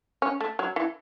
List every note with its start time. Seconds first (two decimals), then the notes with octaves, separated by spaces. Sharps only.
0.22 C#4
0.41 A3
0.59 F#3
0.76 E3